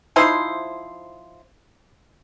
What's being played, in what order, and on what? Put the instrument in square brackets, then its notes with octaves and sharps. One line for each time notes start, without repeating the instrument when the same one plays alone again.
[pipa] F3 D#4 E4 C5